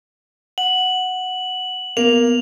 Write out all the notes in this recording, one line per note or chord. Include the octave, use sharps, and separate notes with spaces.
F#5 F#7
A#3 B3 F7